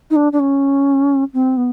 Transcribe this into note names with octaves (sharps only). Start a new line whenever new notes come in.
D#4
D4
D4
C#4
C4
B3